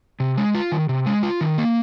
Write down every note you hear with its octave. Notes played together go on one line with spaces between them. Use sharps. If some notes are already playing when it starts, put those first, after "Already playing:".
C3
G#3
F4
D#3
C3
G#3
F4
D#3
A#3